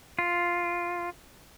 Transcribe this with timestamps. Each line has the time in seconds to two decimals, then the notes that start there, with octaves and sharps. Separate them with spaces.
0.19 F4